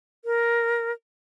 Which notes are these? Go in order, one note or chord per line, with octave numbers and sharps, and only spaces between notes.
A#4